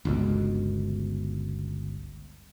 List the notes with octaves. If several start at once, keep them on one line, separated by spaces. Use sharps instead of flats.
G1 C#2 B2